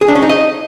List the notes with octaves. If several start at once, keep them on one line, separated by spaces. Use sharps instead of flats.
G#4
D4
C#4
D#4
D#5